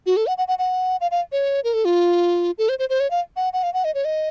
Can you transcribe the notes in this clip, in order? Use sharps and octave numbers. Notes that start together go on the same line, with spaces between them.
F#4
A4
F#5
F#5
F#5
F#5
F5
F5
C#5
A#4
A4
F4
A4
C5
C5
C5
C#5
F5
F#5
F#5
F5
F#5
D#5
C#5
D#5